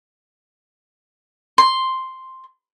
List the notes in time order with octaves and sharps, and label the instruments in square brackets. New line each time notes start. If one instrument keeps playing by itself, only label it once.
[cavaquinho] C6